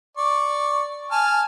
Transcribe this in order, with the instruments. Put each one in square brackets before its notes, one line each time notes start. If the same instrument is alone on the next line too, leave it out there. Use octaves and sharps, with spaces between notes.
[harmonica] D5 C#6
G#5 A5 F6